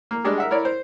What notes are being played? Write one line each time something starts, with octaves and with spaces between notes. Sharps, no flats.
A#3
G3 G#3 D4
A#4 E5 F#5
E4 A#4 C#5 D5
C5